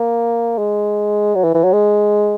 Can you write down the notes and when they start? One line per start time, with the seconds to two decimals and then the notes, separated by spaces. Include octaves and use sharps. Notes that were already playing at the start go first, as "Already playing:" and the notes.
Already playing: A#3
0.58 G#3
1.35 F#3
1.44 E3
1.54 E3
1.64 F#3
1.73 G#3